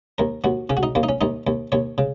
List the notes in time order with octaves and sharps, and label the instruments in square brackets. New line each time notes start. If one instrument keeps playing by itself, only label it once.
[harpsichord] D#2 A#4
D#2 F#4
C#3 C#4
F#4
D#4
D#2 A#3
D#4
C#4
D#2 D#4
D#2
D#2 C#5
C#3